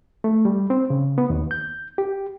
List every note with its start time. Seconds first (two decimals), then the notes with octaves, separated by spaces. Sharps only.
0.24 A3
0.45 G3
0.70 C4
0.90 C#3
1.18 B3
1.30 D#2
1.51 G6
1.98 G4